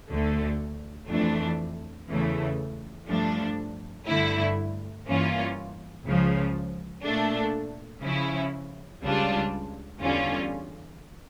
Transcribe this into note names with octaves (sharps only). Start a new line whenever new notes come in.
D2 D3 A3
F2 E3 A3 D4
E2 C#3 E3 A3
G2 F3 A3 D4
G2 D3 A3 E4
G2 E3 A#3 C#4 F4
C#2 C#3 F3
A#2 A3 D4
C#3 F3 C#4 E4
C#2 C#3 G3 D4 F4
E2 D3 G3 C#4 F4